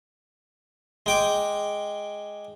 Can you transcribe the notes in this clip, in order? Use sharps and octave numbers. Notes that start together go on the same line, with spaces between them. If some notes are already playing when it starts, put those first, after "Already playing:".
G#3 G5 D6